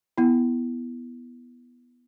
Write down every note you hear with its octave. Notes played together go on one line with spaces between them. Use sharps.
B3 E4